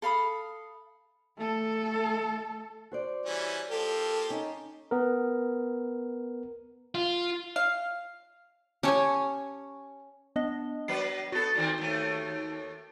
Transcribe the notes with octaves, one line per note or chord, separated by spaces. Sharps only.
A4 F5 B5 D#6
A3 A4
F#4 C5 D5
E3 G3 C#4
F3 A#3 G4 A4
C#4 D#4
B3 A#4
F4
F5
C#4 G4 A4 C#5 G#5
B3 D4 D#5
F#3 B4 C7
B3 F#4 A4
A#2 D#3 C4
D#2 A3